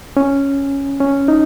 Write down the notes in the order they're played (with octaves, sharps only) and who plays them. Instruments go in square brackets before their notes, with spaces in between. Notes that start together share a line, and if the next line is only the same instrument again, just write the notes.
[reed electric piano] C#4
C#4
D#4